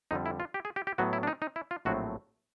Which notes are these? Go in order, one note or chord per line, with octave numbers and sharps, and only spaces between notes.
F2 D3 G3 D#4
E4
F4
G4
G#4
G4
G4
A2 F#3 B3 F#4
E4
D4
D#4
D#4
E4
F4
A#1 A2 F#3 A3 C4 F#4